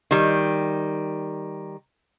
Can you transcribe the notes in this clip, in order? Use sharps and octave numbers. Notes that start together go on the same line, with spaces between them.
D#3 G3